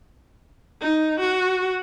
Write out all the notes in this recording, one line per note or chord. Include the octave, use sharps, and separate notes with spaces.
D#4
F#4